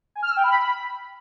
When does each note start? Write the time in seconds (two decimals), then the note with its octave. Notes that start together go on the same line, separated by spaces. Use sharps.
0.15 G#5
0.23 F6
0.30 E6
0.37 G5
0.44 B5